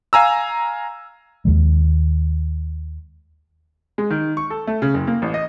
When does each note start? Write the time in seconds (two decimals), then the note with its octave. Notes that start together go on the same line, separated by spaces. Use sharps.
0.13 F5 G#5 A#5 E6
1.45 D#2 D#3 G#3
3.98 G#3
4.10 D#3
4.37 C#6
4.50 A4
4.67 A3
4.82 C#3
4.94 F#1
5.07 A#3
5.22 A1
5.34 D#5